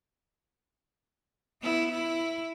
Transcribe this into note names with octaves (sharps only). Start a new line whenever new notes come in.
B3 E4
E4